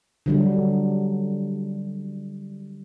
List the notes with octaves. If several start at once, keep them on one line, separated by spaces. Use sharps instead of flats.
D3 F#3 G3